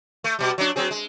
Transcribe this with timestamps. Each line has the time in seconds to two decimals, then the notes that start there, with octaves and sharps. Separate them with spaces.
0.24 A3
0.39 B2 G3
0.58 F#3 D4
0.76 F#3 C4 G#4
0.91 G#3